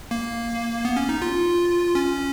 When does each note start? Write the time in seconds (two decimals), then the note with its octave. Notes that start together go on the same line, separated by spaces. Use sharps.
0.11 A#3
0.85 B3
0.96 C#4
1.09 D#4
1.22 F4
1.95 C#4